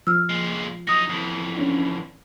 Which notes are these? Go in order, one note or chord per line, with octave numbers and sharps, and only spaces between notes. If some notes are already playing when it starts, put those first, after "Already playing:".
F3 E6 F6
A#2 G#3
F#3 D#4 D#6 A#6
F2 E3
C#4 D4